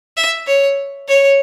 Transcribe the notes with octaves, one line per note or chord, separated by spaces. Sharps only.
E5
C#5
C#5